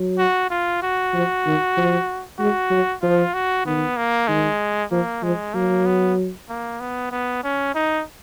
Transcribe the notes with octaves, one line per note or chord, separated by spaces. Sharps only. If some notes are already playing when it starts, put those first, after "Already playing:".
Already playing: F#3
F#4
F4
F#4
F3
D#3
F3
G#3 F#4
F#3
F3 F4
F#4
D#3 B3
A#3
D#3 G#3
F3 A#3
F3 G#3
F#3 A#3
B3
A#3
B3
B3
C#4
D#4